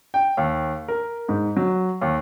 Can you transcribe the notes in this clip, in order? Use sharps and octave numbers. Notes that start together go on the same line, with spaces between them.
G5
D#2
A#4
G#2
F#3
D#2